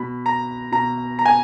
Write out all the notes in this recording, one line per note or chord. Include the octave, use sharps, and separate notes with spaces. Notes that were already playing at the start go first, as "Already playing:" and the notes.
Already playing: B2 B5
A#5
B2 A#5
A#5
G#5